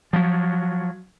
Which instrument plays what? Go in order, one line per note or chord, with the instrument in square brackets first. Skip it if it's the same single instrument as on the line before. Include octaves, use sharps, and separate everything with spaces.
[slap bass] F3 F#3